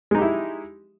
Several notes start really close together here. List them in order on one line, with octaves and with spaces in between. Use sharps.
G#3 D#4 G4 E4